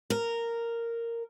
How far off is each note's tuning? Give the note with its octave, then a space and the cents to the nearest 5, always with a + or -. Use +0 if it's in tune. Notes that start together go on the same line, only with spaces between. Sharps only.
A#4 -10